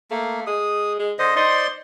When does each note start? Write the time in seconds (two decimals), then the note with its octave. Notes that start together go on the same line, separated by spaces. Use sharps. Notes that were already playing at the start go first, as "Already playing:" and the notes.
0.11 A3 A#3
0.47 G#3 D#6
0.99 G#3
1.19 D3 C5 D#5
1.36 D#4 C5 D5 C6